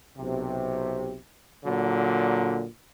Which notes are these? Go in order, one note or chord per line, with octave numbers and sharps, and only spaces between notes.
B1 C3
A#2 D3 F#3